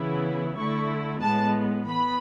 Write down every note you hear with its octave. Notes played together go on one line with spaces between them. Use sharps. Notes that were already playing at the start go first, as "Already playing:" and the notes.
Already playing: C#3 E3 B3 E4
D3 A3 E4 C#6
A2 G#3 B3 A5
E3 B3 B5